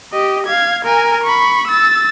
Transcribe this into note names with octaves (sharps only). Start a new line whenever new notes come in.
G4 D#5
F5 G#6
A#4 G#5
B5 C#6
E6 A6